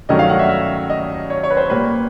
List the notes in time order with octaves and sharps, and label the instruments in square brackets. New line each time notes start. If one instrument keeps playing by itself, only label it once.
[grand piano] G2 D#3 F#3 A3 C#4 D#5
F5
F#5
E5
E5
D#5
C#5
C#5
B4
C5
A#2 G3 A#3 B4